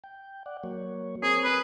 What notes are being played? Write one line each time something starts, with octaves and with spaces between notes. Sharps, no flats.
G5
D5 F#5
F#3 A#3 C#5
C4 G#4 A#4 C#5
B4